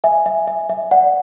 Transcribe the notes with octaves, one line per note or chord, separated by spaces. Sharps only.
E5 G#5
E5
E5
E5
D5 F#5